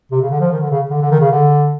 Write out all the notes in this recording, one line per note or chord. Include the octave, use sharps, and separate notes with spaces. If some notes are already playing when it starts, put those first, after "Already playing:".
C3
C#3
D3
F3
D#3
D3
C#3
D3
D3
D#3
C#3
D3